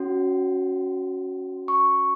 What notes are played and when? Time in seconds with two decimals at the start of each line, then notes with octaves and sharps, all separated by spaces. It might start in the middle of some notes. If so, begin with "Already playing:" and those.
Already playing: C#4 F#4 C6
1.68 C#6